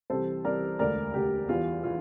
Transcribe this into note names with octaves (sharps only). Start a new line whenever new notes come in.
C2 C3 E3 A4 C5
C2 C3 E3 A#4 D5
E1 D2 D3 A#4 D5
E1 D2 D3 G4
E2 E3 G3 F4
E3 F4